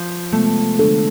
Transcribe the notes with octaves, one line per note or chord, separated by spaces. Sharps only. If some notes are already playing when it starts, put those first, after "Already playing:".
Already playing: F3
C3 G#3 A3 B3
D3 G#3 D4 A4